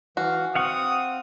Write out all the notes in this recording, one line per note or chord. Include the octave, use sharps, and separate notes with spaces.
E3 F#4 F5
C4 F5 F#5 C#6 D#6